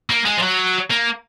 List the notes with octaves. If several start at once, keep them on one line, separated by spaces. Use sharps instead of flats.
A#3
G#3
F3
F#3
A#3